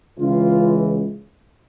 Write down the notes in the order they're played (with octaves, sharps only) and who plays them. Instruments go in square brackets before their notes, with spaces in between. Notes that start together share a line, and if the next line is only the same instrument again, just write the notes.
[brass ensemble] C#2 C#3 E3 F4